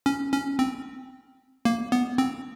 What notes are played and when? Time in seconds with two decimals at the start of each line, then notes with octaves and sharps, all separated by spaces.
0.06 C#4
0.32 C#4
0.59 C4
1.65 A#3
1.92 B3
2.18 C4